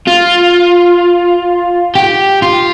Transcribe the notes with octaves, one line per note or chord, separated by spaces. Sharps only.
F4
G4
F4